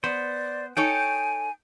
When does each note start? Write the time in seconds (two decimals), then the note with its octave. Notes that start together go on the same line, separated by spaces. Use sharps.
0.04 B3 C5 D5
0.77 D#4 A4 C#5 G5 G#5